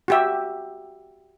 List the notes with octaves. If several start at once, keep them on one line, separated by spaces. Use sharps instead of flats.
F#4 G4 E5